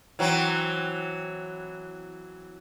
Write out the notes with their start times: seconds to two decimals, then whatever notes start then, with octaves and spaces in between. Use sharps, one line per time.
0.19 E3 F#3 C4